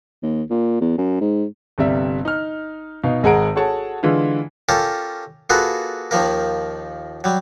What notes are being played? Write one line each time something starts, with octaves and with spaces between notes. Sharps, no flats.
D#2
A#2
E2
F#2
G#2
G1 C3 G3 E5
D#4 F6
B2 D#4 F5
G#1 G#3 G#4 F#5 A#5 D7
F#4 G#4 A4 C#5 F#5 A5
D3 E3 G#3 F4
C#4 F4 G4 A4 A#4
A#3 F4 F#4 G#4 A4 B4
D#2 D#3 F3 A#3 A#4
F#3 G3